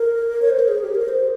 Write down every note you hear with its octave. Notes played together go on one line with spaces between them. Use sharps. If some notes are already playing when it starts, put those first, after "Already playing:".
Already playing: A#4
C#5
C5
A#4
G#4
G4
A#4
C5